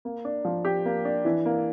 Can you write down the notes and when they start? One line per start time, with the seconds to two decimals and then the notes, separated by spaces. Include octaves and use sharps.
0.05 A#3
0.25 D4
0.45 F3
0.65 G4
0.85 A#3
1.05 D4
1.25 E3
1.45 A#3